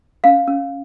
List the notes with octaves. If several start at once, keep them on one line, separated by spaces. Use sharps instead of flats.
C#4 F5
C#4